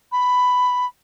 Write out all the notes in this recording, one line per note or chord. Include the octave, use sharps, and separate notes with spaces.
B5